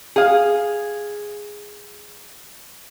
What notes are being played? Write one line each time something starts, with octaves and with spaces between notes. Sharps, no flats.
G#4 F5